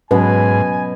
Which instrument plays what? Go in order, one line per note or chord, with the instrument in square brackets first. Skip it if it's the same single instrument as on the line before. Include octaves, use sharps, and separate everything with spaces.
[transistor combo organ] G#2 [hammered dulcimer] B2 [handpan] F#3 C#4 B4 [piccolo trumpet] G#5